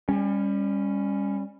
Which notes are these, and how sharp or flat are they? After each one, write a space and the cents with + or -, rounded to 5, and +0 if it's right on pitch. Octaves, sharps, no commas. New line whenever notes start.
G3 +30 C#4 +0